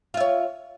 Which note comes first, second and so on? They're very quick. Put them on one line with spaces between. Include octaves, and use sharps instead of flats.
F4 E5 C#5